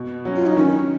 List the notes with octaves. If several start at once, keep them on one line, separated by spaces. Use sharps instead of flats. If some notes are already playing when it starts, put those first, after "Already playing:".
Already playing: B2
F#3 C#4
F4
D#4
D#3 C#4